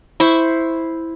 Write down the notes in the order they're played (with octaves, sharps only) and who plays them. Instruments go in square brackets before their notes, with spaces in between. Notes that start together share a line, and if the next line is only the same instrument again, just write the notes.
[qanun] E4 C5 C#6